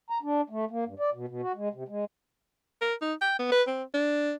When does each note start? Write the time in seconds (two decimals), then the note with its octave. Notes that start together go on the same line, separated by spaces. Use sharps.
0.10 A#5
0.23 D4
0.50 A3
0.71 A#3
0.86 G2
0.99 D5
1.14 B2
1.28 B2
1.42 F#4
1.55 G#3
1.73 C3
1.89 G#3
2.82 A#4
3.02 D#4
3.21 G5
3.39 B3
3.52 B4
3.68 C4
3.94 D4